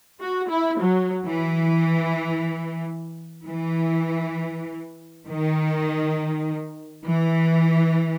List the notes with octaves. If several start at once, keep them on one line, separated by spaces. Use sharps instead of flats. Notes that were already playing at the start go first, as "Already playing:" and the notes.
F#4
E4
F#3
E3
E3
D#3
E3